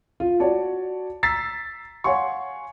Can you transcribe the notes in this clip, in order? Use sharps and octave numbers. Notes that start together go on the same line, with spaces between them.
F4
F#4 C#5 D5 A5
A#5 E6 A6 B6 C7
C#5 F5 F#5 G#5 C6 C#6